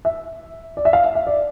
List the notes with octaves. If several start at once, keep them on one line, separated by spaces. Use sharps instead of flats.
E5
D5
E5
F5
E5
E5
D5